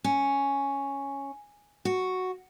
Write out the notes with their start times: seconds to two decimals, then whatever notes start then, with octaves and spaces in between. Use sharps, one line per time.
0.04 C#4
1.85 F#4